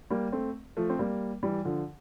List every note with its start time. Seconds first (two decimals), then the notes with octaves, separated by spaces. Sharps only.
0.11 G3 A#3
0.32 A3 C4
0.77 F3 A3
0.90 C4
0.99 G3 A#3
1.43 E3 G3
1.65 D3 F3